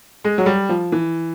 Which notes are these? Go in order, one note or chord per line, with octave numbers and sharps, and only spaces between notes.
G#3
F#3
G3
F3
E3